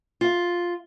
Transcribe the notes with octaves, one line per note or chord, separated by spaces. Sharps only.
F4